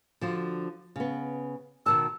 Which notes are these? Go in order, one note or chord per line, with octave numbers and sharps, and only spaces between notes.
D3 F3 F#4
C#3 B3
B2 D#3 A5 E6